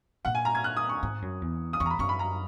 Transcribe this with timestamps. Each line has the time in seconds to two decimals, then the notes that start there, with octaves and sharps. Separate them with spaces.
0.25 A#2 F#5
0.35 G#5
0.45 A#5
0.55 G#6
0.64 F#6
0.77 D#6
0.89 C#6
1.03 G#2
1.22 F#2
1.42 E2
1.73 D#6
1.80 E2 C#6
1.86 A#5
1.90 B5
1.99 F#2 C#6
2.09 B5
2.19 A#5